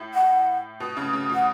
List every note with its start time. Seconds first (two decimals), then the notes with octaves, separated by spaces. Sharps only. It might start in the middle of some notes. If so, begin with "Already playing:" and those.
Already playing: A2
0.14 F#5
0.80 B2
0.97 C#3
1.13 C#3
1.30 B2 F#5